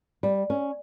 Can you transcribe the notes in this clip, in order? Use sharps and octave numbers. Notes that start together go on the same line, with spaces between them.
G3
C#4